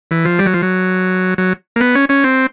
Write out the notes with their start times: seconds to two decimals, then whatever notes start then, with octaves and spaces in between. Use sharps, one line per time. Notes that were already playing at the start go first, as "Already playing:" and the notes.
0.11 E3
0.25 F3
0.39 G3
0.46 F#3
0.54 F3
0.62 F#3
1.38 F#3
1.76 A#3
1.81 B3
1.95 C#4
2.09 C#4
2.24 C4